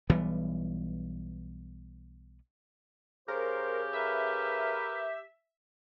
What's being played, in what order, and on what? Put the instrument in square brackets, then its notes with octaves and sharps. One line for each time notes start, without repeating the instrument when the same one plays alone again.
[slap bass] B1 E3 G3 B3
[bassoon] C#3 [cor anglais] G4 [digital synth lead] A#4 [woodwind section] C5
[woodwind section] A#4 B4 [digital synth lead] E5